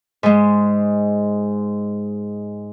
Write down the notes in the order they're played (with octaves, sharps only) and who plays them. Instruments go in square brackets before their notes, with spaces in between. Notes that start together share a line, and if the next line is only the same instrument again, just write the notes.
[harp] G#2 G#3